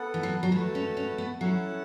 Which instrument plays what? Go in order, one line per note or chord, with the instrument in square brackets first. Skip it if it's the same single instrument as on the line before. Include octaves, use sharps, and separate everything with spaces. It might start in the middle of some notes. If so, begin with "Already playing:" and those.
Already playing: [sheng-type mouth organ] B3 A4 F#5
[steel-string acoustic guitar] E3
F#3
F#3
[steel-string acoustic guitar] E3 [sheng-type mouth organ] A3 F#4 B4 A5
[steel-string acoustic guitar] C#4
C#4
B3
[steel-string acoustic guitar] F#3 [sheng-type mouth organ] C#4 E4 A4 F#5 A5